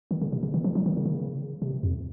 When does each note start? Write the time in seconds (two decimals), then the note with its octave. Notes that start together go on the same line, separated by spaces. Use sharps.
0.11 D#3
0.21 C#3
0.32 C3
0.43 C#3
0.54 D#3
0.64 F3
0.75 F#3
0.86 D#3
0.97 C#3
1.05 D#3
1.14 C#3
1.62 C3
1.83 F2